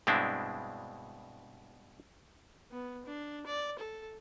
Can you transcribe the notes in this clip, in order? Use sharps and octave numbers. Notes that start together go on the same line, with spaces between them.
G2 B2 G#3 C4 D4 E4
B3
D4
D5
A4